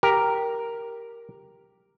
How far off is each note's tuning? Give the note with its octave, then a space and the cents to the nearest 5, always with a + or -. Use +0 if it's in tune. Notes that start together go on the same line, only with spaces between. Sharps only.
G4 +0 A#4 +0